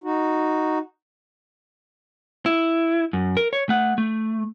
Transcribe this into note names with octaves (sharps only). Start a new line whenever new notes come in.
D#4 F#4
E4
F#2
A#4
C#5
A3 F#5
A3